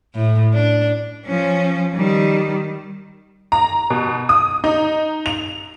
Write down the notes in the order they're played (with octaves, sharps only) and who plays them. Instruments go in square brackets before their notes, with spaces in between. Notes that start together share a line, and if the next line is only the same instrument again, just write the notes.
[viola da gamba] A2
D4
[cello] F3 C#4
D#3 G3
[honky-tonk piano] A#5
B2
D#6
D#4
F7